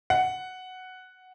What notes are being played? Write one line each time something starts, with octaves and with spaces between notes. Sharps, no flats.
F#5